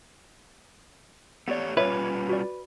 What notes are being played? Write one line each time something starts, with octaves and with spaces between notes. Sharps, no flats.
A3 B3 G4 C#5 D5
G3 C#4 F4 B4 C#5 E5
F#4 D5